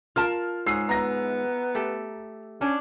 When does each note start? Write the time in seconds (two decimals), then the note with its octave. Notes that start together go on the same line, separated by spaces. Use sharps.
0.16 F4 A#4 A5 F6
0.66 G#2 G#4 C#5 E6 C7
0.89 B3 A#5 A#6
1.75 A3 G4 A4
2.61 C#4 D4